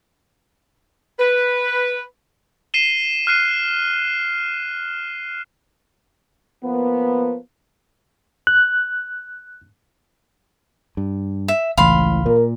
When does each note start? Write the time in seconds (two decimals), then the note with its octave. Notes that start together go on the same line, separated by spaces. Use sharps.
1.18 B4
2.74 C7 D#7 E7 G7
3.27 F6 F#6 C7 D#7
6.63 F3 A#3 B3
8.47 F#6
10.97 G2
11.48 E5
11.78 G#1 C#2 A2 E3 F5 B5 C6
12.26 A#2 A#4